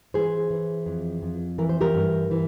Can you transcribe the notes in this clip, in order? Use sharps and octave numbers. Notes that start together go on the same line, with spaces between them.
E3 G#4 C5
E3
F2
F2
E3 A#4
C5
G4 A#4
G2
E3